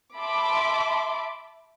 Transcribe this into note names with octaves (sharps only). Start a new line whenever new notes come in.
E5 A5 B5 C6 D6